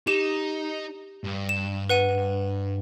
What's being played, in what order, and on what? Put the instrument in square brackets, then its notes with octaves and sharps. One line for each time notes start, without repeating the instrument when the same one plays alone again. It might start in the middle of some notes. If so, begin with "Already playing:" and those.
[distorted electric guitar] D#4 [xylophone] G4 E7
[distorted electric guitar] G2
[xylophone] E7
B4 F#5 D#7